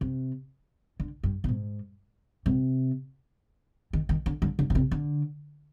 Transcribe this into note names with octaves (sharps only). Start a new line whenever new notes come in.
C3
D3
G2
B2
G#2
C3
D#3
D#3
D3
D3
D3
B2
C3
D3